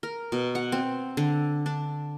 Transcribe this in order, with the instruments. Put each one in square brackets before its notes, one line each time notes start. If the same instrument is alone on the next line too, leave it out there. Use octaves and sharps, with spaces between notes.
[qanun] A#4
B2
F#5
C4
D3
D4